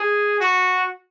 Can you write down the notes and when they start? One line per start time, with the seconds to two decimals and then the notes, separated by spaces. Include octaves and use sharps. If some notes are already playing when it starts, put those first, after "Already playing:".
Already playing: G#4
0.40 F#4